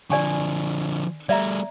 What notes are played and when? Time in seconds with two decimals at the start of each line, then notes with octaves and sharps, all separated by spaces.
0.10 D3 F3 D5 G#5 C#6
1.29 G3 A3 D5 E5 A#5